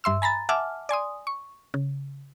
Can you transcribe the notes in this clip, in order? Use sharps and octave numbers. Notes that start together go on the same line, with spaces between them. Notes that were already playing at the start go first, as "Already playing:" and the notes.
G2 E5 C6 E6
G#5 A#5 B5 A6
E5 F#5 G#5 A5 D6 F6
D5 G#5 C6 D#6
C#6
C#3